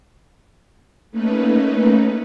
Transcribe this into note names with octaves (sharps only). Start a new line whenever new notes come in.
A3 A#3 C#4 D#4 B4